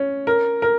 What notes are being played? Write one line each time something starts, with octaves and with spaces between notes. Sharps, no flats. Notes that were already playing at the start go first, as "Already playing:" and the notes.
Already playing: C#4
A#4
A#4